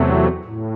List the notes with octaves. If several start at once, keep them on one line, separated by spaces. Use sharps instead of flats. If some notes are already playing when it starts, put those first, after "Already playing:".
Already playing: E2 C3 F#3 A3
A2